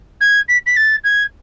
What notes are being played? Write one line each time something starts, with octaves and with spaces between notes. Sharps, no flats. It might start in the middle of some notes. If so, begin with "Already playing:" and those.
G#6
B6
B6
A6
G#6